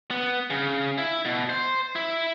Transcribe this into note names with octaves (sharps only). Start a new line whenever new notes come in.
B3
C#3
E4
B2
C5
E4